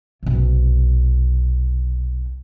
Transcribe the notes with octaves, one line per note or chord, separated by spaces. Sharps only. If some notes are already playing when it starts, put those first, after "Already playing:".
B1 C3